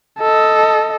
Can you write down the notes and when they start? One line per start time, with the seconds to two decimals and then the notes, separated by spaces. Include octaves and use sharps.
0.20 A4 D#5